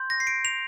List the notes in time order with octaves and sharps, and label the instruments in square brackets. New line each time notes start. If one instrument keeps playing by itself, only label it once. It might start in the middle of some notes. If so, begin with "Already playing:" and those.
Already playing: [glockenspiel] C6 G6
A#6
C7
D7
F7